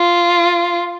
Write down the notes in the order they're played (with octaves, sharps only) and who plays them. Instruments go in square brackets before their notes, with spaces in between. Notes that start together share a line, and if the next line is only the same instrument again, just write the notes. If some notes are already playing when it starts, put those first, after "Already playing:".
Already playing: [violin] F4